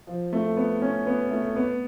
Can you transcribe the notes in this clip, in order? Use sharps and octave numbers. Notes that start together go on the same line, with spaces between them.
F3
A3
B3
C#4
B3
A3
B3